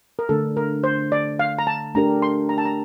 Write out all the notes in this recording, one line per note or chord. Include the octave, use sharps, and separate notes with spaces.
A#4
D3 A3 D4 A4
A#4
C5
D5
F5
A#5
A5
A3 D4 G4 A#4 A#5
C6
A#5
A5
A#5